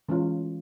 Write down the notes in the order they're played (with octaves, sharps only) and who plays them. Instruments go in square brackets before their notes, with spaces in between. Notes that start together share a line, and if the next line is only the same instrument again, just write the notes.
[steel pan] E3 G#3 C#4 F4